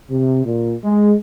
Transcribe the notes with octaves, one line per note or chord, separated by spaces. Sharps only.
C3
A#2
G#3